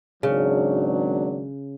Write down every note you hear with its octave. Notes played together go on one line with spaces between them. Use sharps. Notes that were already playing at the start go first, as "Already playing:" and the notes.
G#1 C#3 F#3 D4